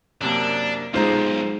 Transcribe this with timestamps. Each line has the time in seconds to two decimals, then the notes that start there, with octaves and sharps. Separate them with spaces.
0.21 F#2 C3 A#3 D4
0.94 B1 G#3 D#4 F4 C5 A#5